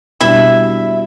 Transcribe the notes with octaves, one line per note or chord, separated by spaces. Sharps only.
B2 G3 D4 E4 E5